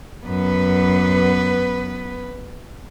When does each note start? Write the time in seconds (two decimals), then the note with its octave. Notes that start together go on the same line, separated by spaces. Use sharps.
0.26 F#2 B3 B4